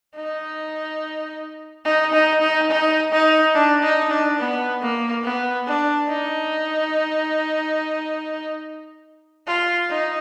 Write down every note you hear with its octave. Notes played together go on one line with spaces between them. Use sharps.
D#4
D#4
D#4
D#4
D#4
D#4
D4
D#4
D4
B3
A#3
B3
D4
D#4
F4
D#4